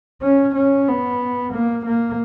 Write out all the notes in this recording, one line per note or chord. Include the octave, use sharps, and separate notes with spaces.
C#4
C#4
B3
A#3
A#3